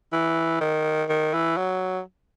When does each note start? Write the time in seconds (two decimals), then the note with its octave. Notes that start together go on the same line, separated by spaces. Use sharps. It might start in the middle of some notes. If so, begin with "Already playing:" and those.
0.13 E3
0.61 D#3
1.09 D#3
1.34 E3
1.57 F#3